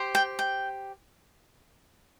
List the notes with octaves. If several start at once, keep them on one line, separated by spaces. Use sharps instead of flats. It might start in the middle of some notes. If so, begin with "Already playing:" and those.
Already playing: G4 C5
G5
G5